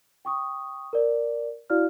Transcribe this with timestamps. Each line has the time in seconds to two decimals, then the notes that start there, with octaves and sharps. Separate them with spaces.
0.25 G5 C#6 D#6
0.93 A#4 D5
1.70 E4 F#4 D5 F5 F6